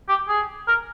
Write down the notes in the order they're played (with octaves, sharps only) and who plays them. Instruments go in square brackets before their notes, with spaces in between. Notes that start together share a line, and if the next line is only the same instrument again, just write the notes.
[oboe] G4
G#4
A#4